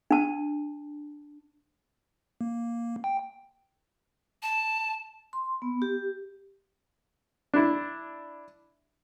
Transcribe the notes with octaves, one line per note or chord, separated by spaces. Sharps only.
D4 A5
A#3
G5
A5
C6
B3
G4
D4 E4